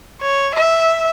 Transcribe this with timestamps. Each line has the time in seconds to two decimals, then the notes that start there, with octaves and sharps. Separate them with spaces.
0.22 C#5
0.55 E5